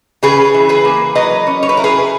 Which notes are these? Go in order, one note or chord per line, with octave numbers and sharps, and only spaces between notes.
C#3 G#4 B4
E3
G#4 B4
A#3
F#3 B4 D#5
C#4
C#5
B4
E4 A#4
G#4 B4